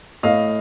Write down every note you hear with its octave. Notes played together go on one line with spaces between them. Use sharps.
A2 D#5 F5